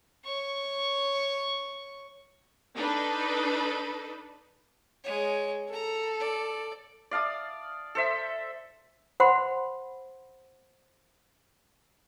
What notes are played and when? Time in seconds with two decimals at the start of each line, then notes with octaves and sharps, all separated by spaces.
0.25 C#5 C#6
2.77 D4 D#4 A4 B4
5.04 G#3 C#5
5.73 A4 A#5
6.20 D5
7.11 D5 F5 A5 D#6
7.95 A4 C5 E5
9.20 C5 F#5 B5 C6